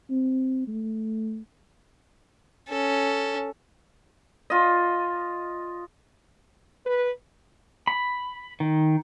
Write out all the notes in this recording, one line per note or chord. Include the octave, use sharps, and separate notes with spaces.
C4
A3
C#4 A4
F4 D#5
B4
B5
D#3